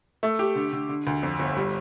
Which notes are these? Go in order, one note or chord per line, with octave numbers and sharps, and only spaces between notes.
A3
G4
D3
D3
D3
D2
F2
G1
G3